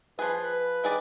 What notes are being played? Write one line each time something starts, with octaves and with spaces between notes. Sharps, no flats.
F3 G#4 B4
B4
D#3 G#4 D5